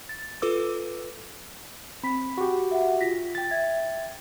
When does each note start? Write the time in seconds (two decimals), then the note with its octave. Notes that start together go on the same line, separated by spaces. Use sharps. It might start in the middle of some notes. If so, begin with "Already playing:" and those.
0.09 A6
0.42 F4 A4 B4 D6 E6
2.04 C4 B5 B6
2.38 F#4 G4
2.71 E5 F#5
3.01 F4 A#6 B6
3.35 G5 A6
3.51 E5 G#6